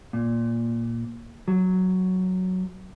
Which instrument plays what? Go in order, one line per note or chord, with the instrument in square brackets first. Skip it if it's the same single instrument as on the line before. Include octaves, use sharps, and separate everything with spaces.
[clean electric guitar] A#2
F#3